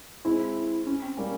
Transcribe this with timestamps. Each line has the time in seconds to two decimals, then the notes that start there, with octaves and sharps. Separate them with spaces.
0.25 G#3 C4 E4
0.87 C#4
1.02 C4
1.17 G3 A#3 C#4